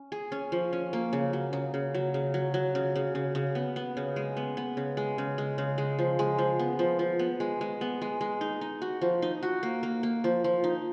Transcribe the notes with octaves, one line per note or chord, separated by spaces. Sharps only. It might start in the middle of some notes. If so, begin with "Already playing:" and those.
Already playing: C#4
G#4
C#4
F3
C#4
A#3
C#3
F#3
C#3
C#3
F#3
C#3
F#3
F#3
C#3
C#3
C#3
C#3
B3
B3
C#3
G#3
B3
B3
C#3
G#3
C#3
G#3
C#3
G#3
F3
G#3
F3
B3
F3
F3
B3
G#3
G#3
B3
G#3
G#3
D#4
D#4
F#4
F3
D#4
F#4
A#3
A#3
A#3
F3
F3
D#4